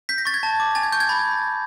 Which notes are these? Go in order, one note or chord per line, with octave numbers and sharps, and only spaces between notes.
G6 B6
A#6
C#6 A6
G#6
A5
D6
G#5 A6
G#6
C#6 G6
G#6
B5 A6